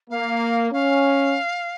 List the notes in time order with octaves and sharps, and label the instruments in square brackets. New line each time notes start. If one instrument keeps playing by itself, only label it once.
[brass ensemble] A#3 [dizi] F5
[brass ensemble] C#4 [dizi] F5